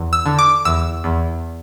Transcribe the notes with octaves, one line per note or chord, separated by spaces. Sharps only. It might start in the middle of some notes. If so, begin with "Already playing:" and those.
Already playing: E2
E6
D3
D6
E2 E6
E2